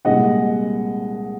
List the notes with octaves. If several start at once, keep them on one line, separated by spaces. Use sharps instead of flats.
C2 A#2 G#3 D#5 F#5